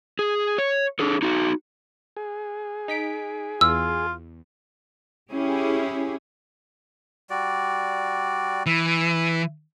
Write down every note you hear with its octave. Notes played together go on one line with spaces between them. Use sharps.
G#4
C#5
D4 G#4 A4
D#4 F#4
G#4
D#4 B6 D7
E2 F4 E6
C#4 E4 G4 G#4
G3 F#4 D5
E3 E5